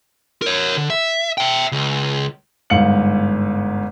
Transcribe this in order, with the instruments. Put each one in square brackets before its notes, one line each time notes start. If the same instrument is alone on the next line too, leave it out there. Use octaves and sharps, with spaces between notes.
[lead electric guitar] A#4 C#5
D3
E5
E5 G5
C#2
[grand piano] G1 G#2 F5 C#7 F#7